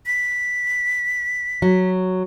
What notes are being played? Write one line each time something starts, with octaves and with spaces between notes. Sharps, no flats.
B6
F#3